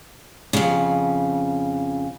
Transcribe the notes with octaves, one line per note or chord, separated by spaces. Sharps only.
F2 C#3